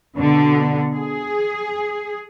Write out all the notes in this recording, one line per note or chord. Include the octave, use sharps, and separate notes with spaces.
B2 D3
G#4